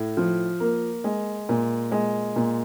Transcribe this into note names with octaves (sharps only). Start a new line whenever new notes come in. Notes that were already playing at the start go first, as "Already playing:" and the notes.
Already playing: A2
F3
A#3
G#3
A#2
G#3
A#2